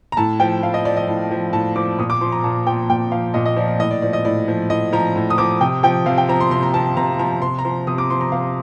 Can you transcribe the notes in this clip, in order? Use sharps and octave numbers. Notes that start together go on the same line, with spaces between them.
A#5
A2 A5
F3 G5
A2 F5
D#5
F3 D5
D#5
A2
F3
A2 A5
F3 D6
A#2 D#6
D6
F3 C6
A#5
A#2 A5
F3 G5
A#2 G5
F3 F5
A#2 D#5
D#5
F3 D5
D5
A2 D#5
D5
F3 D5
D#5
A2 D5
F3
A2 D#5
F3 A#5
A2
D#6
F3 D6
C3 G5
F3 G5
C3 F5
G5
F3 A#5
C6
C3 C6
A#5
F3 A5
C3 A#5
F3 A#5
C3 C6
A#5
F3 C6
C3 D#6
D6
F3 C6
A#5
C3 F5